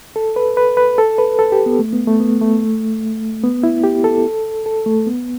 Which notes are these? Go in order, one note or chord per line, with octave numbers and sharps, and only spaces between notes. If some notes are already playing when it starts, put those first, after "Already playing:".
A4
B4
B4
B4
A4
B4
A4
G4
B3
A3
B3
A3
B3
A3
B3
E4
G4
A4
A4
A3
B3